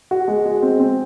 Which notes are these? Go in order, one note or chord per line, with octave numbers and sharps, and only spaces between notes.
F#4
G#3
G#3
C4
C4